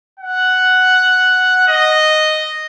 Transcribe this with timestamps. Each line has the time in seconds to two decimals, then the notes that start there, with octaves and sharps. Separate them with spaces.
0.20 F#5
1.68 D#5